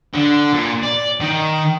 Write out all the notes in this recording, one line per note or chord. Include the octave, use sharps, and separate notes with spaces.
D3
A#2
D5
D#3